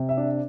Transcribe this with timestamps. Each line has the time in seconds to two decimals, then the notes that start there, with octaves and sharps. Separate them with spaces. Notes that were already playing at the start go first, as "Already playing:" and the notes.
Already playing: C3
0.09 E5
0.17 D4